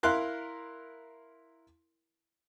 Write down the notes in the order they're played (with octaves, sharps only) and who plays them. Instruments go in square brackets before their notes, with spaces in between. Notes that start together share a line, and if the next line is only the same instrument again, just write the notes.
[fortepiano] E4 A#4 F5 C6 F#6